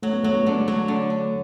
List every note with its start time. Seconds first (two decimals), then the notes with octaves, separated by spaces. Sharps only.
0.03 F#3 A3
0.13 B3
0.23 F#3 A3
0.33 B3
0.44 D3 A3
0.61 G#3
0.67 F#3 A3
0.88 D3
1.10 D3